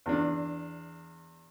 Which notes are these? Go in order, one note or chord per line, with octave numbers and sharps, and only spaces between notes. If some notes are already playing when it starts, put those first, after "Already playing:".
E2 D4